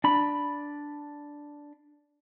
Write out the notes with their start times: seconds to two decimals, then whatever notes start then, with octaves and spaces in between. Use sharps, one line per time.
0.04 D4 B5